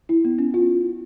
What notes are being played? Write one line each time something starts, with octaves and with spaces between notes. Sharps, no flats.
E4
B3
C#4
F4